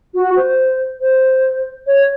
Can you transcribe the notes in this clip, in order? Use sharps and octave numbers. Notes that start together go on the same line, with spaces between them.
F#4
C5
C5
C#5